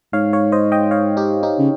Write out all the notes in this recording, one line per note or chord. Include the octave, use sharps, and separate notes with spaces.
G#2 C#5 F5
C#5 F5
C5 D#5
D#5 G5
C#5 F5
D#4 G4
D#4 G4
C#3